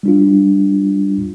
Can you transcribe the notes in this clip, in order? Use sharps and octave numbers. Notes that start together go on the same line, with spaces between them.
G3 D4 F4